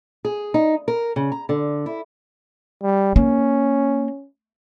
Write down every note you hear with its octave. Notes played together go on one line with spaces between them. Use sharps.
G#4
D#4
A#4
C#3
A#5
D3
E4
G3
A#3 C#4